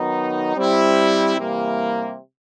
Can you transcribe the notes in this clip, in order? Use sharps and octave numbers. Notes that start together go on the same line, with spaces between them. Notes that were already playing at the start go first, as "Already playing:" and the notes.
Already playing: D#3 F#3 B3 D#4
G3 C4 E4
C3 E3 G3 A#3